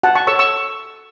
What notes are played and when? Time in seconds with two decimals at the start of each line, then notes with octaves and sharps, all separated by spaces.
0.03 F#4 F#5 A5
0.15 A5 C#6
0.27 A4 C#5 C#6 E6
0.39 C#6 E6